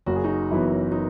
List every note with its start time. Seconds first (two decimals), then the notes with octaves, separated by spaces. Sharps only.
0.06 F#1 F#4
0.16 G#4
0.24 D#4 F#4
0.51 F#2 E3 B3 E4
0.92 D#4